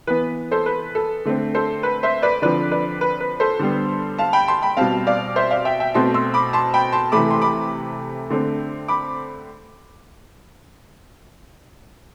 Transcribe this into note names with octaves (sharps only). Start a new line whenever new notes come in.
E3 B3 B4
A4 C5
B4
A4
D3 A3 C4
A4 C5
B4
C5 E5
B4 D5
D3 F3 C4 B4 D5
B4 D5
B4
B4
A4 C5
D3 G3 B3
F5 A5
G5 B5
A5 C6
G5 B5
B2 G3 C4 F5 A5
D5 F5
C5 E5
D5 F5
E5 G5
E5 G5
B2 A3 C4 A5 C6
C6 E6
B5 D6
A5 C6
G5 B5
A5 C6
C3 E3 A3 B5 D6
C6
B5 D6
D3 A3 C4
B5 D6